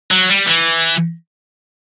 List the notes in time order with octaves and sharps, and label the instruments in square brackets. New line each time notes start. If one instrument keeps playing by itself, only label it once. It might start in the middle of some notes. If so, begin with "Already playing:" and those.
[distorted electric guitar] F#3
G3
E3